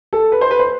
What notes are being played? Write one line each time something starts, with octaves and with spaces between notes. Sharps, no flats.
A4
B4
C5
B4
C5